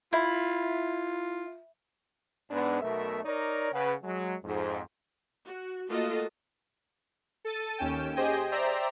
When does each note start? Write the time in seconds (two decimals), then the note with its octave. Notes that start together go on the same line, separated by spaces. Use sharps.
0.13 E4 F4
2.50 G#2 B3 D4
2.81 B1 B2 A3 A#4 E5
3.24 D#4 A#4 C#5 D5
3.72 C#3 B4 F#5
4.03 F#3 G#3
4.44 F2 G#2
5.46 F#4
5.89 A3 A#3 F4 F#4 A4 D#5
7.45 A4 A6 D#7
7.77 D#2 C#4 G5 E7
8.15 G4 G#4 C5 D#5 G5 G#5
8.52 C5 D5 E5 G5 A#5